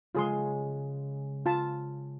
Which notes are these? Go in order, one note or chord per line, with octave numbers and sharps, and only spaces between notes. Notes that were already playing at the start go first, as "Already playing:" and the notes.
C#3 G#3 F4 G#4 C6
F4 A5